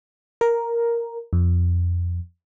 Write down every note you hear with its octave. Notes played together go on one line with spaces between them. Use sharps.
A#4
F2